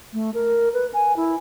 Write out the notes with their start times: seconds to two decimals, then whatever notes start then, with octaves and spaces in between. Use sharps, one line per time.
0.13 A3
0.34 A#4
0.74 B4
0.94 G#5
1.17 E4